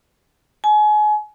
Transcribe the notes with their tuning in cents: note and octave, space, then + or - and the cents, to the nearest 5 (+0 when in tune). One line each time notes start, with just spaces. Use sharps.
G#5 +30